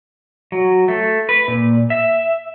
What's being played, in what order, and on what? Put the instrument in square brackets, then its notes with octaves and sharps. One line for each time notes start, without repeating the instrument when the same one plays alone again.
[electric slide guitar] F#3
A3
B4
A#2
E5